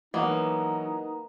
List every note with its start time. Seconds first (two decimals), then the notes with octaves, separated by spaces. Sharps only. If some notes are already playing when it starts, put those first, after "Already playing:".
0.14 E3 F#3 A#3 B3 D#4